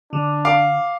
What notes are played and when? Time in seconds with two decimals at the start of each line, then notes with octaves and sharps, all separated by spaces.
0.13 D3 D4
0.45 F5 D6